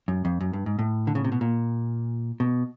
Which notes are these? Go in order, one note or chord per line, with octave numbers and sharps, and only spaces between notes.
F#2
F2
F#2
G2
G#2
A2
D3
C#3
C3
B2
A#2
B2